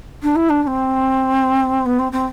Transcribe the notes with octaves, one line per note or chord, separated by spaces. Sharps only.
D4
E4
D4
D4
C4
B3
C4
C4